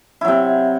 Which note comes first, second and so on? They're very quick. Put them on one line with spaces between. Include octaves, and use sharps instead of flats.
E4 F#3 C3